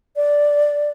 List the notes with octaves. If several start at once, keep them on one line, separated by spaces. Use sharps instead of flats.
D5